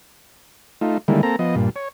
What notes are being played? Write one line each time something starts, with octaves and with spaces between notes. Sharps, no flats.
A3 D#4 F4
D3 D#3 G3 G#3 A#3 E4
A#3 C4 A4 A#5
F3 B3 D#5
G2 A#2
C#5